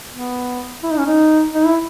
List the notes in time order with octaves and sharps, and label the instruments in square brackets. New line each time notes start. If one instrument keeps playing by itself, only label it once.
[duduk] B3
E4
D#4
C#4
D#4
D#4
E4